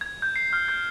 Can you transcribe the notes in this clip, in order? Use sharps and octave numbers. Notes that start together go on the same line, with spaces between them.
G#6
G6
C7
F6
G6